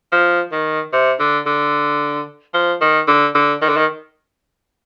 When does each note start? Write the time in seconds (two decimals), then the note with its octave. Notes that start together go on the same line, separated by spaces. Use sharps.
0.12 F3
0.52 D#3
0.93 C3
1.20 D3
1.46 D3
2.54 F3
2.81 D#3
3.08 D3
3.35 D3
3.62 D#3
3.69 D3
3.77 D#3